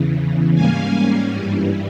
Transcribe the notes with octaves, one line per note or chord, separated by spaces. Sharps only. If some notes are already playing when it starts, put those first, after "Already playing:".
Already playing: E2 C#3 E3
G#2 G3 A#3 C#4 F5 G#5
G2 E3 G3